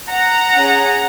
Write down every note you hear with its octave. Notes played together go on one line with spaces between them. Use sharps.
F#5 A#5
C#4 G#4